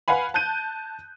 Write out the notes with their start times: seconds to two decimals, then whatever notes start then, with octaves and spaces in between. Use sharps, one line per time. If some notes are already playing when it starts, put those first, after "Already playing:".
0.08 B4 F5 F#5 G#5 B5
0.34 A5 F#6 G6 D#7